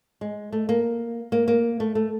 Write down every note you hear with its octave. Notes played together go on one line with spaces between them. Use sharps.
G#3
A3
A#3
A#3
A#3
A3
A3